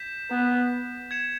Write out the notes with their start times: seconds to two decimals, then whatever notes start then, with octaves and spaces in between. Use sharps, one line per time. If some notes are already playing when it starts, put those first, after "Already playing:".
Already playing: G6 B6 E7
0.31 B3
1.11 G#6 C#7 E7